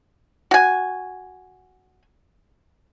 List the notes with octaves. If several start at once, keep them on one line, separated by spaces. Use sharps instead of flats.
F#4 G#5